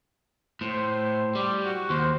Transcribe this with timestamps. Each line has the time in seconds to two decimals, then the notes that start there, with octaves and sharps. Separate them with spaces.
0.61 A2 C5
1.35 G3 G4
1.65 F#4
1.90 D#2 C5